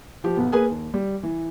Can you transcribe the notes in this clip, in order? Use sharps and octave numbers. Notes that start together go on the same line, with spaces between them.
F3 G4
B1 B3
A#3 G#4 B4 G#5
D#2
G3
E3